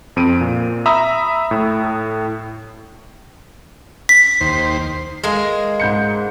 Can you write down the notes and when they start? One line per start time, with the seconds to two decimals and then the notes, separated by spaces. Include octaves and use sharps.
0.16 F2 C4 D7 D#7
0.41 A#2
0.86 E5 A#5 B5 D#6 E6
1.51 A2
4.09 B6
4.41 D#2 C5
5.23 G#3 A#3 G#4 D#5
5.80 G#2 G6 C#7